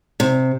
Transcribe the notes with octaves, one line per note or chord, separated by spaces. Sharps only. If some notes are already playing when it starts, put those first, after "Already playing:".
C3